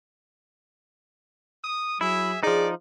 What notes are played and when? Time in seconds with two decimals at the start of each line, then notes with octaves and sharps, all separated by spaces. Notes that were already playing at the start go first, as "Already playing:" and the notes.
1.64 D#6
2.01 F#3 E4 G#4 E5
2.43 F3 D4 D#4 G#4 D5